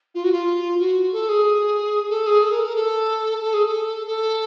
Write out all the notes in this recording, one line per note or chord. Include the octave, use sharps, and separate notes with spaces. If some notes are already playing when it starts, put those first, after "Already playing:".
F4
F#4
F4
F#4
A4
G#4
A4
G#4
A4
A#4
A4
A#4
A4
A4
G#4
A4
A4